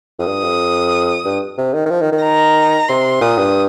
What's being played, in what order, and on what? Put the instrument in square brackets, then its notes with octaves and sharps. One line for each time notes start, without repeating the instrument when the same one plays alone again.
[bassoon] F2
[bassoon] G2 [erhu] D#6
[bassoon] F2
G2
C3
D#3
D#3
F3
D#3
D#3
[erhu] A#5
[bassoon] C3 [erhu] C6
[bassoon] A#2 [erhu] D#6
[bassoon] G2